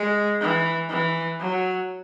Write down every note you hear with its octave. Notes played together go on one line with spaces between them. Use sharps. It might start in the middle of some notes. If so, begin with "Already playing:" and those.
Already playing: G#3
E3
E3
F#3